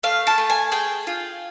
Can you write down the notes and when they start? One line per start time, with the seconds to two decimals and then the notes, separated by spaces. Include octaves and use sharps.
0.03 A3 F5
0.27 A5
0.38 A3
0.50 G#5
0.72 G#4 G5
1.07 F4